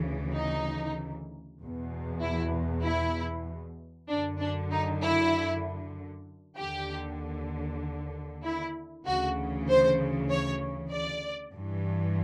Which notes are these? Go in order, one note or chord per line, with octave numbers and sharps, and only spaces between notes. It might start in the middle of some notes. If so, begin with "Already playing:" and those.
Already playing: D2 C#3 E3
D#4
E2 B2
E4
E4
F#2 D3 D4
D4
D#4
E4
D#2 D3 G4
E4
D2 C#3 E3 F#4
C5
C#5
D5
G2 E3